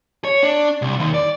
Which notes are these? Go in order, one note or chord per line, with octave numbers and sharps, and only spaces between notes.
C#5
D4
C2
D#2
D5